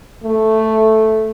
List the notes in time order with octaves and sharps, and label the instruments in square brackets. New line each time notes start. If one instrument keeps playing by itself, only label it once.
[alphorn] A3